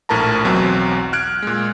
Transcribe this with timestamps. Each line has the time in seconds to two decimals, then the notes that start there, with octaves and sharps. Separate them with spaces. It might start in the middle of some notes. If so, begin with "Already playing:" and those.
0.09 A#1 A2 A#4 A5 A#5
0.45 B1 E2 F#3 C4
1.13 F6 F#6 G#6 D7
1.43 A#2 G#3